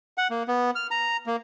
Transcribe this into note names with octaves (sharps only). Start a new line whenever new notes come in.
F#5
A#3
B3
F6
A#5
A#3